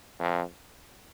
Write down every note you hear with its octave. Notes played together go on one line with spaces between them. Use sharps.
F2